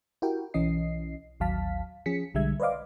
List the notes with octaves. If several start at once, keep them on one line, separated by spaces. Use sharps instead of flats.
E4 F#4 G4 A#4 G5
B1 E3 C#4 D#5 C7
A1 D#2 F#3 F5 A5 B6
F3 C#4 G#4 B6 C#7
B1 D3 G3 G#3 E5 G#6
B4 C5 D5 D#5 F5 D6